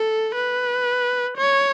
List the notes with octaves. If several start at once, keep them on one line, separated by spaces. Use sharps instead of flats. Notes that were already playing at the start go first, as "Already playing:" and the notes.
Already playing: A4
B4
C#5